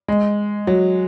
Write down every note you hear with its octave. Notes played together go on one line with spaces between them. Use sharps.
G#3
F#3